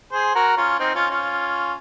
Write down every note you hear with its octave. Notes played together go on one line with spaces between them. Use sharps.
G#4 C5
F#4 A#4
C#4 F4
C4 D#4
C#4 F4
C#4 F4